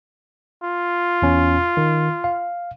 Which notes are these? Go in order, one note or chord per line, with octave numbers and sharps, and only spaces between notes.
F4
E2 C#4
D#3
F5